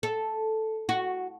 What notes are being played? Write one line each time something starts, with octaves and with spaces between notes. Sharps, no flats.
A4
F#4